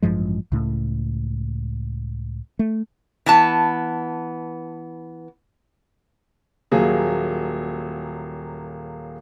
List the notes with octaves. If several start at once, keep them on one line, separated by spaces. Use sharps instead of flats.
A1 G2 F3 G#3
C#2 A2
A3
E3 B3 A5
D#1 F#3 A#3 G#4